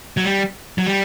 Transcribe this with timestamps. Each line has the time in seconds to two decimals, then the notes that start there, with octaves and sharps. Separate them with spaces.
0.17 F#3
0.24 G3
0.78 F#3
0.86 G3